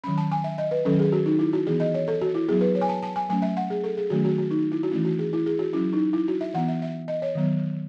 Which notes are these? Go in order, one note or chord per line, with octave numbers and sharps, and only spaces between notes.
D#3 F#3 C#4 B5
A5
G#5
E5
D#5
B4
D#3 F#3 C#4 A4
G#4
F#4
D#4
E4
F#4
E3 B3 G#4
D#5
C#5
A4
F#4
E4
F#3 B3 G#4
B4
C#5
G#5
A5
A5
G#5
F#3 A3 C#4 G#5
E5
F#5
G#4
A4
G#4
D#3 F#3 A3 C#4 F#4
F#4
F#4
D#4
E4
F#4
E3 A3 C#4 E4
F#4
G#4
E4
G#4
F#4
F#3 C#4 E4
D#4
E4
F#4
E5
E3 B3 F#5
E5
E5
D#5
C#5
D#3 F#3 B3